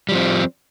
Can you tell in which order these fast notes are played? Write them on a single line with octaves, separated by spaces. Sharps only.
G3 F3 C4